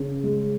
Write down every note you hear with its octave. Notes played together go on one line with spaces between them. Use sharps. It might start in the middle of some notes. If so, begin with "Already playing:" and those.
Already playing: C#3
G#3